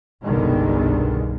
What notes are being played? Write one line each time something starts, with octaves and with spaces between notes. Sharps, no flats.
G1 C2 B2 D3 D#3 G#3